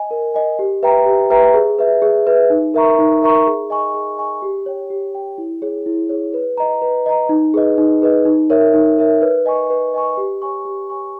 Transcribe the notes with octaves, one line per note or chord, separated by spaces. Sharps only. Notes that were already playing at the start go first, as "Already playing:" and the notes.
Already playing: D#5 G#5
A#4
D#5 G#5
G4
B4 E5 G5 A#5
G4
B4 E5 G5 A#5
G#4
B4 E5
G#4
B4 E5
D#4
A#4 E5 A#5 C#6
D#4
A#4 E5 A#5 C#6
G#4
D#5 G#5 C#6
G#4
D#5 G#5 C#6
G4
C#5 G5
G4
C#5 G5
E4
G#4 C#5
E4
G#4 C#5
B4
D#5 A#5
B4
D#5 A#5
D#4
G#4 B4 D#5
D#4
G#4 B4 D#5
D#4
A#4 C#5 E5
D#4
A#4 C#5 E5
B4
D#5 G#5 C#6
B4
D#5 G#5 C#6
G4
C#5 G#5 C#6
G4
C#5 G#5 C#6